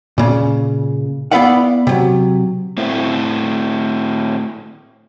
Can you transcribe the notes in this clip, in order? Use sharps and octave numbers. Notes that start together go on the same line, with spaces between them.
A#2 C#3
B3 E4 B4 D5 F5 F#5
C3 F#3
A2 A3 C4 E4